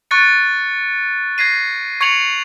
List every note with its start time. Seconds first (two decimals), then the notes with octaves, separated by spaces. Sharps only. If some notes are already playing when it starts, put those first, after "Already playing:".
0.11 C#6 F#6 A6 C#7
1.38 G#6 A#6 C7 D#7
2.01 C#6 G#6 C#7 F7 F#7